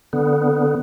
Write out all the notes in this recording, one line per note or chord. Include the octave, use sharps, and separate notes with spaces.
D3 B3